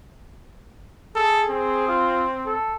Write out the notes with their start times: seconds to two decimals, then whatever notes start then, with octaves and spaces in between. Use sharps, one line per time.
1.15 G#4 A4
1.50 C4
1.88 F4
2.46 A4